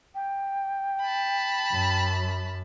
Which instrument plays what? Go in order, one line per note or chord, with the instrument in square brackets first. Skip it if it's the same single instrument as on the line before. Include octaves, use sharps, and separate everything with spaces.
[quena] G5
[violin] A5 B5
[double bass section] F#2